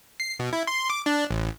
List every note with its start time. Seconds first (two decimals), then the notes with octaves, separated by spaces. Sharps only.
0.20 C7
0.39 B2
0.53 E4
0.67 C6
0.90 D6
1.06 D4
1.31 A1